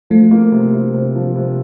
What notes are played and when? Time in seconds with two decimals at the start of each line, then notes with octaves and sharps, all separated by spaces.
0.10 F3 A3
0.31 A#3
0.52 C3
0.73 C3
0.94 C3
1.15 F3
1.36 C3